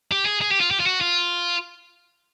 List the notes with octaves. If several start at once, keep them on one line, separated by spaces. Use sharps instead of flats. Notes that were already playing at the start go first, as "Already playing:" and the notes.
G4
G#4
G#4
G4
F4
G4
F4
F#4
F4